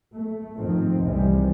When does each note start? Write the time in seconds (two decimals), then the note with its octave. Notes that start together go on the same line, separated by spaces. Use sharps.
0.14 A3
0.58 F2 G#2 D#3 F3 C4
1.01 C2 C3 E3 G3 G#3